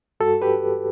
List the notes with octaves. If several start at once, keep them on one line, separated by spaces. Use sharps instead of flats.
G2 F#4 A4
G4 B4